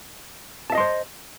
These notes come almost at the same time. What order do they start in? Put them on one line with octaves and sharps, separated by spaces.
A5 E5 D#5 C6 C5